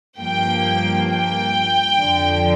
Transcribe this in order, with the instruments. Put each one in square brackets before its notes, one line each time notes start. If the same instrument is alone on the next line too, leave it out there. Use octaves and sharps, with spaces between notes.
[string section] G2 F3 A#3 G5
G5
F2 D3 F3